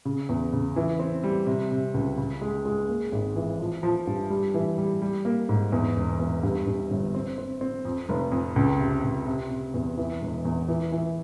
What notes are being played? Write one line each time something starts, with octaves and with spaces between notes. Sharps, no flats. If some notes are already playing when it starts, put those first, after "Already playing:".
C#3
E2
C#3
E3
C4
G3
C3
C3
C#2
C#3
G#3
G#3
A#3
G#1
E3
F3
F3
G2
G3
E3
G3
G3
A#3
G#2
E2
E1
E2
G2
G2
G1
C4
C4
C4
F2
F1
F2
C#2
C3
C#2
C3
C3
E2
E3
E1
E2
E3
E3